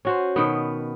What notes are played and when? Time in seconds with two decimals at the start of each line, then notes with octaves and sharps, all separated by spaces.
0.05 C#4 F#4 C5
0.36 B2 D#3 B3